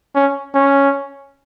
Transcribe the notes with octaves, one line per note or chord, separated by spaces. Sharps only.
C#4
C#4